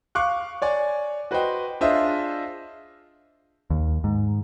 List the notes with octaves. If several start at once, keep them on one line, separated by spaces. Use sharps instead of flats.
F5 C#6 D6 F#6
C#5 D5 G#5
F#4 B4 C5 D#5 G5
D4 F4 G#4 C5 D#5 E5
D#2
G#2